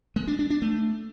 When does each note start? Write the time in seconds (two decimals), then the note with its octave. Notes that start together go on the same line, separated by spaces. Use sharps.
0.16 G#3
0.28 D4
0.39 D4
0.50 D4
0.62 A3